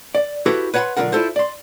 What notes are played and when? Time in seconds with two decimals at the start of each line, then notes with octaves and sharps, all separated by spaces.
0.15 D5
0.46 E4 F#4 G4 A4 B4 C5
0.74 B4 C#5 F#5 A5 B5 C6
0.97 B1 D3 F#3 F4 A#4 F#5
1.13 E4 F4 A4 C5
1.36 D5 C6